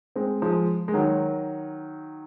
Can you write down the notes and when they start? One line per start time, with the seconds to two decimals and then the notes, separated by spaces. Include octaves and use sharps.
0.16 G#3 C4
0.42 F3 G#3
0.88 G#3
0.94 D#3 F#3